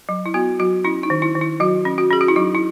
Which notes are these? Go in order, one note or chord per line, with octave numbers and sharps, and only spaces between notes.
F#3
E4
B3 F#4
F#3 F#4
C#4 E4
D#4
D#3
E4
D#3
E4
F#3 F#4
C#4
F#4
C#4 G#4
F#4
E4
F#3 D#4
E4